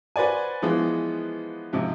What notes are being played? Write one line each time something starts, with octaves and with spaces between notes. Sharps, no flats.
F#4 B4 C5 D5 G#5
E3 F3 G#3 B3
G#2 C3 F3